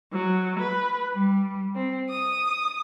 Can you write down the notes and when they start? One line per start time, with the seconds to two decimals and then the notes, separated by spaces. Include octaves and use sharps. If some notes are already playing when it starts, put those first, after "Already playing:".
0.13 F#3
0.59 B4
1.15 G3
1.74 C4
2.08 D#6